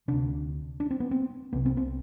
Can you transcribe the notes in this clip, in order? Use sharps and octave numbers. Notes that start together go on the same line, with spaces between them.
D2 C3 D4
D4
C4
B3
C4
C2 C3 B3
C4
C4